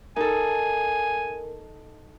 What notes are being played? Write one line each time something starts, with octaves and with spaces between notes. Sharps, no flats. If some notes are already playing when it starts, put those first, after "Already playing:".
D#4 A4 A#4 G#5